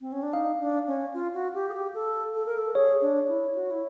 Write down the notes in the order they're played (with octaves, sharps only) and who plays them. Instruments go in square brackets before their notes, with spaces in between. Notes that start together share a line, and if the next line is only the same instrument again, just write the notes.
[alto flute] C4
C#4
D4
[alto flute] D#4 [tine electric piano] F5
[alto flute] D4
C#4
F4
F#4
G4
G#4
G4
A4
A4
A#4
A4
[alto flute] G#4 [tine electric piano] C#5
[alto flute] D4
E4
F#4
E4